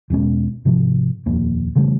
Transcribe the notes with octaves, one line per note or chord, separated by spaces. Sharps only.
E1 B2 G#3 C#4
G#2 C3 F3
D#1 F2 A#3
C#3 E3 G3 A3